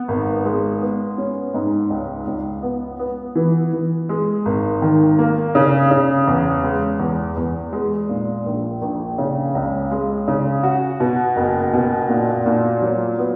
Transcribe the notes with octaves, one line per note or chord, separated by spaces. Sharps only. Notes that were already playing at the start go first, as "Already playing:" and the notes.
Already playing: B3
G#1
G#3
B3
C#4
G#2
C#2
C#2
B3
B3
E3
E3
G#3
G#1
D#3
A#3
C#3
C#3
E2
G#3
E2
E2
G#3
A#2
A#1
A#1
C#3
C#2
G#3
C#3
F#4
B2
F#1
B2
A#2
A#2
F#3
B3